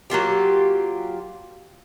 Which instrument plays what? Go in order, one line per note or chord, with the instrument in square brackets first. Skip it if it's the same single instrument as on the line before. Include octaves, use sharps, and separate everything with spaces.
[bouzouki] F#3 A#3 F4 G4